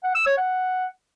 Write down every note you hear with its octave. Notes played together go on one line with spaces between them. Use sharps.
F#5
E6
C#5
F#5